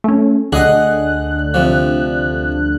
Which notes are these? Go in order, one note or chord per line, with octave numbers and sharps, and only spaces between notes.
A3 C#4
D2 D3 G#4 D#5 F#5 F#6
C3 F3